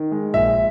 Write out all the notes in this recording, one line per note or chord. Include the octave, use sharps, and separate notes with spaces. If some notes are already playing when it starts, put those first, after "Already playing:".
Already playing: D#3
G#3
A#1 E5